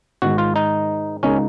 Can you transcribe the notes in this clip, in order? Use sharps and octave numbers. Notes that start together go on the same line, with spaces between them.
G#2 D#3 G#3 F#4
F4
D#4
C#2 C#3 G#3 C#4 D#4 A#4